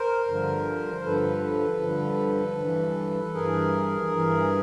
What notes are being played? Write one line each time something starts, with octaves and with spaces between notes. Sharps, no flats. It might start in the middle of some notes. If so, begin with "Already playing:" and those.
Already playing: A#4 C5
G2 D3 F3
A#4
G2 D3 F3 A4 B4
G2 D3 F3
G2 E3
G2 E3 G#4 A#4
G2 E3